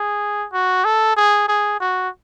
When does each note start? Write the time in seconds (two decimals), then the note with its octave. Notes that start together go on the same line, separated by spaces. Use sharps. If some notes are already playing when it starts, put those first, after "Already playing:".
Already playing: G#4
0.53 F#4
0.85 A4
1.16 G#4
1.48 G#4
1.80 F#4